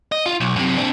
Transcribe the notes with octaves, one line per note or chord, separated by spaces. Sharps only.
D#5
F4
B1
F#2 C3
C4 D4